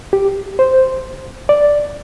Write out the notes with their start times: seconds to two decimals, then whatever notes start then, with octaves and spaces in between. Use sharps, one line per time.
0.13 G4
0.59 C5
1.49 D5